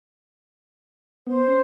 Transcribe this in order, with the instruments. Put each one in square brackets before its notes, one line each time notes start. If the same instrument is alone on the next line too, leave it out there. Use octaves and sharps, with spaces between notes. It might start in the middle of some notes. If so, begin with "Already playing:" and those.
[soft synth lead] B3 [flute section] C5
[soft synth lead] C#4